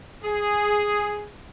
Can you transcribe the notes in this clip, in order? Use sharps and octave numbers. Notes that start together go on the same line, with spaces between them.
G#4